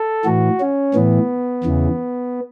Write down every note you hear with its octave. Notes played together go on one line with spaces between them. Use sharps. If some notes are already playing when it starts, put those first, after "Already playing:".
Already playing: A4
A2 E3 F#4
C#4
A2 E3 B3
E2 C#3 E3